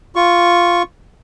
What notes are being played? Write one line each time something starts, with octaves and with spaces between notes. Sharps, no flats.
F4 C#6